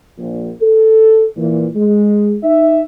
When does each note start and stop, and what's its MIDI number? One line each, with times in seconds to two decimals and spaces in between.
0.17 0.48 34
0.60 1.26 69
1.36 1.66 46
1.36 1.66 52
1.75 2.35 56
2.43 2.81 63
2.43 2.81 76